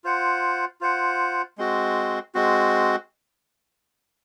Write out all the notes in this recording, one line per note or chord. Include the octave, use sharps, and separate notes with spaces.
F4 C5 F#5
F4 C5 F#5
G#3 C4 F#4
G#3 C4 F#4